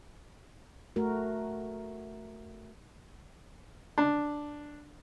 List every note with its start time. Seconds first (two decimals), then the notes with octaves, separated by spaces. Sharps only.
0.96 A3 F#4 A#4
3.98 D4